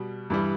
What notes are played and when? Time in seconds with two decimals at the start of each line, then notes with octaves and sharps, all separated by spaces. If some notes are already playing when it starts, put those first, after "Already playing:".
Already playing: B2 G3
0.30 G2 E3 G3